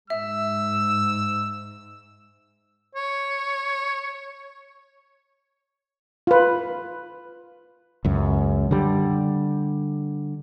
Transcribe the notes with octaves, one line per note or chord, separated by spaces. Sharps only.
G#2 E5 E6
C#5
F4 B4
C#2 F#2
D3 G3